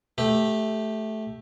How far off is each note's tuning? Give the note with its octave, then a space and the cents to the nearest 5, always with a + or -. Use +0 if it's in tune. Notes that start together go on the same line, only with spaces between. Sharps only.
A3 -10 G4 +0